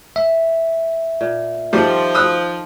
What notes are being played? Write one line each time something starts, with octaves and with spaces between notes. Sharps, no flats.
E5
A#2
D#3 F3 G3 F4 A4
D#6 E6 F#6